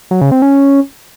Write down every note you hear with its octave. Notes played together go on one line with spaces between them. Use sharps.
F#3
C#3
C4
C#4